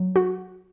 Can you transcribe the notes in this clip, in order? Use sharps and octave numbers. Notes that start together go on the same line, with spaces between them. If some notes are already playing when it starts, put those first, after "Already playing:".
Already playing: F#3
F#4